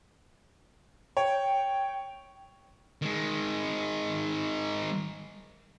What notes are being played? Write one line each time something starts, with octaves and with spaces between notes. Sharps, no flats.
C#5 G5
D#3 G#3